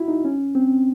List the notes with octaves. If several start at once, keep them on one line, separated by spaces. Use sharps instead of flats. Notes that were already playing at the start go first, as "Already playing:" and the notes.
Already playing: E4 F#4
D#4
C#4
C4